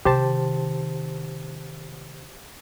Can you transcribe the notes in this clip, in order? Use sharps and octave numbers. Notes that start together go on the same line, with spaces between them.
C3 D#3 G4 C5 A5